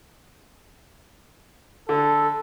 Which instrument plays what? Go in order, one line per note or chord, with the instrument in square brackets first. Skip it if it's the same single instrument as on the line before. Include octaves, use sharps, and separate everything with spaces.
[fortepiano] D3 [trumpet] A4